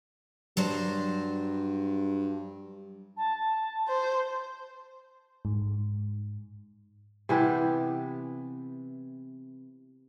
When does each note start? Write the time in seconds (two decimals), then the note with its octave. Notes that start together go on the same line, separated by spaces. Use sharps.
0.57 G2 F#3 D4 C5
3.16 A5
3.88 C5
5.45 G#2
7.29 C3 E3 B3 G4